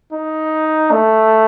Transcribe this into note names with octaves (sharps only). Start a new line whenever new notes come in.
D#4
A3